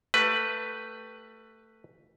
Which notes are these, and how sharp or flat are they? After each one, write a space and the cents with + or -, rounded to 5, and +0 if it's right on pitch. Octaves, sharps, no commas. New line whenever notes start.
A3 +15 G4 +0 B4 +0